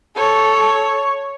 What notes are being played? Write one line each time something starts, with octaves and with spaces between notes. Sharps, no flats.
A4 C#5